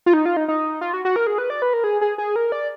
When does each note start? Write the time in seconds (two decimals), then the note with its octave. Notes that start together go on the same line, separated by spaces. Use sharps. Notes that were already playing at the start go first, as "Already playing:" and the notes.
0.06 F4
0.13 D#4
0.26 F4
0.37 D#4
0.48 D#4
0.81 F4
0.93 F#4
1.05 F#4
1.16 A#4
1.27 G#4
1.38 B4
1.50 D5
1.62 B4
1.73 A#4
1.84 G#4
2.01 G#4
2.18 G#4
2.36 A#4
2.52 D5